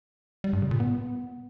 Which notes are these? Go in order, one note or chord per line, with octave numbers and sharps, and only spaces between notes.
G3
G2
C#3
A#2
B3